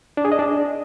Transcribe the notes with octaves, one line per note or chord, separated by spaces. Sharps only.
D4
G#4
D#5
D4